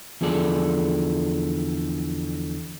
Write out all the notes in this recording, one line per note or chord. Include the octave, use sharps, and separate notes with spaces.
E2 D3 F3 G#4 A4 D5